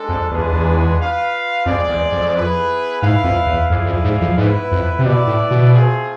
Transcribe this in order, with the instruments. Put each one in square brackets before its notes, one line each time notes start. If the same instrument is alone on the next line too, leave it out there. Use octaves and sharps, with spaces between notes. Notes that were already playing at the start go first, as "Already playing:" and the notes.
Already playing: [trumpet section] G#3 D4 A4
[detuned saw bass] F2
[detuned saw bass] E2 [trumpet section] G#3 D4 F4 G#4 B4
[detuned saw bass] E2
[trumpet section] F4 B4 F5
[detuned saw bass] F2 [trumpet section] G#3 C4 G#4 D5
[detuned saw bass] E2
F2
[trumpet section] B3 E4 G#4 B4
[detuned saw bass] G#2 [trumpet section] E4 B4 F5
[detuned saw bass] F2
E2
[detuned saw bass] F2 [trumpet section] E4 G#4 D5 F5
[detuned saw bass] F2
G#2
F2
[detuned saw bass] G#2 [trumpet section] B3 E4 B4
[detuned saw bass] F2
C3
[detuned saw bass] B2 [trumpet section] E4 B4 D5
[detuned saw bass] A2
B2
[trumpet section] A3 C4 F4 G#4